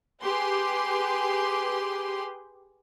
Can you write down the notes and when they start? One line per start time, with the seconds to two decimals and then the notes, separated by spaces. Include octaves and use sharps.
0.22 G4 G#4 B4 C6